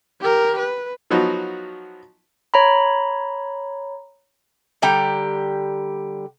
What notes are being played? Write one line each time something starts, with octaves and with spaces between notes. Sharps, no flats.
G4 A#4
B4
F3 F#3 B3 D#4 F#4
C#5 A#5 B5
D3 G3 G4 A#5